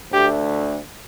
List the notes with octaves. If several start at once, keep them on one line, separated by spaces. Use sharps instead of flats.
D2 D3 A3 G4